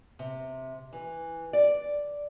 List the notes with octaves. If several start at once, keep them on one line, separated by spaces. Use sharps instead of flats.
C3
E3
D5